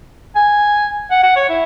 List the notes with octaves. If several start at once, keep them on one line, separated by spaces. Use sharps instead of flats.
G#5
F#5
F#5
C#5
E4